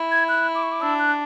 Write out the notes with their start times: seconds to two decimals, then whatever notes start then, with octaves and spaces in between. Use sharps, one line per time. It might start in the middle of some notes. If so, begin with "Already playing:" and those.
Already playing: E4
0.11 G#6
0.29 F#6
0.55 D6
0.63 C#6
0.72 D6
0.81 D4 E6
0.99 F#6